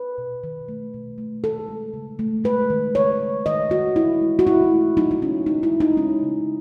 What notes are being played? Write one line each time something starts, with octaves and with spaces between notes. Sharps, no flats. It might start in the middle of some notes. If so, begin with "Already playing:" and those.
Already playing: B4
B2
D#3
A3
B2
A3
D#3 A4
G#3
C#3
A3
G#3 B4
D#3
C#3 C#5
G#3
D#3 D#5
D#3 F#4
G#3 E4
G#3
F#4
B2 E4
A3
F#3 D#4
D#4
C#3 C#4
G#3 D#4
E4
G#3
D#4
G#3 C#4
C#3